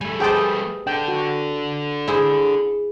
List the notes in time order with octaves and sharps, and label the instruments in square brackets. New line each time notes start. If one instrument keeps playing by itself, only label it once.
[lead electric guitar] G3 A3 [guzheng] G#5
[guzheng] G4 B4 C5 [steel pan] G#4 G5 A5
[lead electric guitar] D4 A4 [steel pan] G5
[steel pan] F#4
[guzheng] E4 G#4 C5